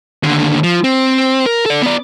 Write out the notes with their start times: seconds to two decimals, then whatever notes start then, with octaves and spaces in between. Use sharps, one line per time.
0.23 D#2 D3
0.64 F3
0.84 C4
1.46 A#4
1.66 A4 D5
1.82 B3 D5